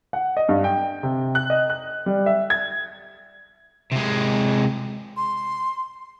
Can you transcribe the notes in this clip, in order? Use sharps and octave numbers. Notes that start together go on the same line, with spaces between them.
F#5
D#5
G2
G5
C3
F#6
D#5
F#6
G3
E5
G#6
C3 G#3
C6